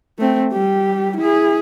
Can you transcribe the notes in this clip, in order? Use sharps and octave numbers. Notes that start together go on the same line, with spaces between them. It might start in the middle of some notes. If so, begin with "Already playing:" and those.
A3 C4
G3 G4
E4 G#4